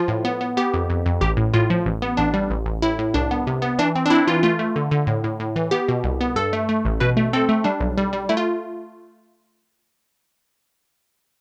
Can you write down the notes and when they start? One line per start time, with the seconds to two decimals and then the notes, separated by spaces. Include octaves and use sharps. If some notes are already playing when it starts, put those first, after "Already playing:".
Already playing: F3 F4
0.08 A2
0.25 B3
0.41 B3
0.57 B3 G4
0.74 F2
0.90 F2
1.06 F2
1.21 A1 G4
1.37 A2
1.54 A2 F4
1.70 F3
1.86 A1
2.02 B3
2.17 A1 D4
2.34 G3
2.50 A1
2.66 A1
2.82 A2 E4
2.99 A2
3.14 C2 D4
3.31 B3
3.47 C3
3.62 B3
3.79 E3 D4
3.95 C4
4.06 D4
4.10 C4 E4
4.27 E3 F4
4.43 A3 F4
4.59 A3
4.76 D3
4.91 D3
5.07 A2
5.24 A2
5.40 A2
5.56 E3
5.71 B3 G4
5.88 B2
6.04 C2
6.21 B3
6.36 G2 A4
6.53 A3
6.69 A3
6.85 A1
7.00 B2 B4
7.17 A3
7.33 C4 A4
7.49 A3
7.64 G3 D4
7.80 B1
7.97 G3
8.13 G3
8.29 A3 E4
8.37 F4